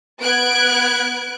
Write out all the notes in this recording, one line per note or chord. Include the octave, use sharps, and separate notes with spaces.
B3 F#6 G#6 D7